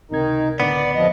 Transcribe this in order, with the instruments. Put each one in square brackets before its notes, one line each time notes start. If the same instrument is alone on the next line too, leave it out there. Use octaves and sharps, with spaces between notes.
[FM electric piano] C#2 C3 G#6 [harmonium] D#3 D#4
[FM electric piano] C#2 A2 D3 [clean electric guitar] B3 [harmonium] D5
[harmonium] F2 F3 D#5